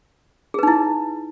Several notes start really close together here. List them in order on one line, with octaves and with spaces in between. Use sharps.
G#4 B4 D#4 E4